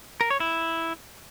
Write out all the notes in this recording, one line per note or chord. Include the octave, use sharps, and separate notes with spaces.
A#4
C#5
E4